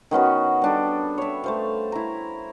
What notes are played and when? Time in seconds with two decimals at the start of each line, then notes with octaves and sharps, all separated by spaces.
0.11 D#3 B3 C#4 F#4
0.62 G3 D4 A4
1.18 C#5 E5
1.44 A3 C5 F5
1.92 E4 A#5